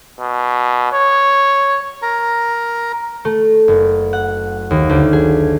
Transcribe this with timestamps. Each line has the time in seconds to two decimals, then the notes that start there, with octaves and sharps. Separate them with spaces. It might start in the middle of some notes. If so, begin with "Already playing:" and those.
0.20 B2
0.92 C#5
2.02 A#4 A#5
3.25 A3
3.68 F#1
4.13 F#5
4.71 D#2
4.89 D2
5.13 G#4